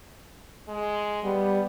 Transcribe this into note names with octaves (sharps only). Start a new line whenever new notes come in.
G#3
G3 B3